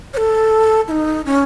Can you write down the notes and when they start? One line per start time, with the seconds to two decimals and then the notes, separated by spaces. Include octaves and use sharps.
0.14 C#5
0.17 A4
0.88 E4
0.91 D#4
1.26 C#4